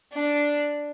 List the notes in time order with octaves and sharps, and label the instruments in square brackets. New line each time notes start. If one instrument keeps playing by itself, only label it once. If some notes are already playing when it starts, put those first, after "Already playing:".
[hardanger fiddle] D4